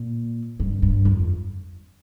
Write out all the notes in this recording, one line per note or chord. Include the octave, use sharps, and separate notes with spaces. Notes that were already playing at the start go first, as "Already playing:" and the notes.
Already playing: A#2
G2
G2
F2